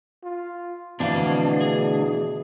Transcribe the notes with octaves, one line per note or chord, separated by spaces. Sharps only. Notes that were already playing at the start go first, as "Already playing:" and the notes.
F4
D2 B2 E3 C4 D4 F5
G#4